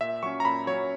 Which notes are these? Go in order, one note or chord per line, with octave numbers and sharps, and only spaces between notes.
A#2 E5
F#3 C#4 C#6
A#5
A#2 B5
F#3 C#4 C#5